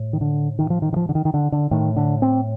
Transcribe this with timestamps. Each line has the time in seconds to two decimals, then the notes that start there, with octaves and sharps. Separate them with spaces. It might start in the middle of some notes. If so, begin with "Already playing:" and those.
Already playing: A2
0.13 D#3
0.21 D3
0.59 D#3
0.70 F3
0.82 D#3
0.93 D#3
0.96 F3
1.09 D3
1.15 D#3
1.25 D#3
1.34 D3
1.52 D3
1.71 A2 D#3
1.96 D3
2.22 C4